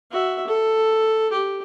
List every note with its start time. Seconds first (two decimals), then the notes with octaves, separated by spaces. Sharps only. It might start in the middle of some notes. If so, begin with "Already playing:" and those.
0.11 F#4 E5
0.47 A4
1.32 G4